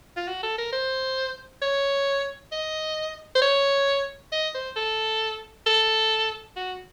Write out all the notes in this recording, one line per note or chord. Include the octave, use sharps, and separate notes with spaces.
F4
F#4
A4
A#4
C5
C#5
D#5
C5
C#5
D#5
C5
A4
A4
F#4